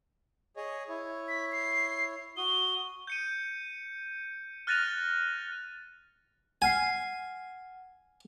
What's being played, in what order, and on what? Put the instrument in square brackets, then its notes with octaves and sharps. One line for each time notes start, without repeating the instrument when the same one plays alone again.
[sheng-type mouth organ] G#4 C#5 D#5
E4 C#5
[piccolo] B6
C7
[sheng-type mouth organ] F#4 D#6 [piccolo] G7
[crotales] G6 C#7 D#7
F6 F#6 A6 A#6 D#7 F7
[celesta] F#5 F6 C7 [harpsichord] G#5